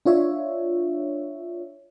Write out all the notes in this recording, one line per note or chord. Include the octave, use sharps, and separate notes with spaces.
D4 F4 C#5 E5